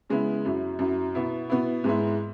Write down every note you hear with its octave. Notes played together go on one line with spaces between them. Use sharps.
C#3 G#3 B3 E4
F#2 F#3 E4
F#2 F#3 E4
B2 B3 E4
B2 B3 E4
G#2 G#3 B3 E4